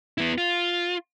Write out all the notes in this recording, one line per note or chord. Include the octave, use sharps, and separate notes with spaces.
B3 E4
F4